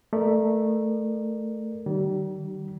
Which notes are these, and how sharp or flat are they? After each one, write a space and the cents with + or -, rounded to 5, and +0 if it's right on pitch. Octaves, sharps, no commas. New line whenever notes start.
A3 +0 A#4 +0 D5 +30
D#3 -20 G3 -40